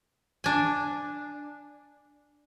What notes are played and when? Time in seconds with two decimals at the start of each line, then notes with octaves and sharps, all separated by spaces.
0.44 D4 G#5